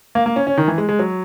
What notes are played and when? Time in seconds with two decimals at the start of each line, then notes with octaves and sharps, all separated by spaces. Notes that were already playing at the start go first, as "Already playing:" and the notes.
0.15 A#3
0.26 A#3
0.36 C#4
0.47 C#4
0.58 D#3
0.68 E3
0.78 G#3
0.89 G#3
0.99 F#3